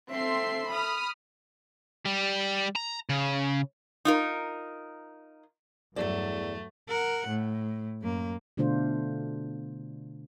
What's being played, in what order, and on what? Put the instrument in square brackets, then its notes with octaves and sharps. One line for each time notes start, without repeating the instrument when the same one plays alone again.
[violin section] C4 C6 C7 [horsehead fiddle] A4 E5
[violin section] B5 D#6 F6
[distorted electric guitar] G3
A#5
C#3
[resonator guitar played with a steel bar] D#4 F4 A#4
[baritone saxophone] E2 [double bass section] G2 F#3 [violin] A3 [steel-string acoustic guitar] D5 E5
[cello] A#4 F#5
A2
F#2 A#3
[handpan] B2 D3 A3 D4 F4 C5